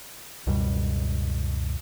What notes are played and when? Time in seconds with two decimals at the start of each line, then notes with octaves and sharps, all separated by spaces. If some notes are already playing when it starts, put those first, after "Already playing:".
0.47 C#2 F#2 B2 G3